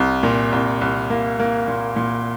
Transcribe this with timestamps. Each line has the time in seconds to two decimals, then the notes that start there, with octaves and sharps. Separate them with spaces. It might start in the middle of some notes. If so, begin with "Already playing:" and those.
Already playing: C2
0.23 A#2
0.52 C2
0.81 C2
1.10 A#3
1.40 A#3
1.68 A#2
1.96 A#2